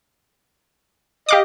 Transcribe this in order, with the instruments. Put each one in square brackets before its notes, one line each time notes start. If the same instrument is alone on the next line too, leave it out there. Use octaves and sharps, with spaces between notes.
[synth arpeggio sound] G4 F5 D6 [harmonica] D#5